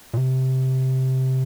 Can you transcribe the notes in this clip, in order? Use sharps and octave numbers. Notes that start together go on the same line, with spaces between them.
A#2
C3